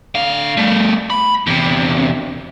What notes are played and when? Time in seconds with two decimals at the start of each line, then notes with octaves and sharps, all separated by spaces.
0.15 D3 F5
0.57 G3 A3
1.10 B5
1.47 E2 C3